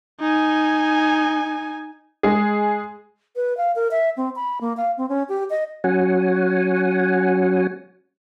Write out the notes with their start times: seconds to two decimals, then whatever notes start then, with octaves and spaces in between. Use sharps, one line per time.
0.20 D#4 G#5
2.23 G#3 G#4
3.36 B4
3.57 F5
3.76 A#4
3.91 E5
4.17 C4
4.36 B5
4.61 A#3
4.77 F5
4.98 C4
5.09 C#4
5.29 G4
5.50 D#5
5.84 F#3 C#4 F#4 F#5 G#5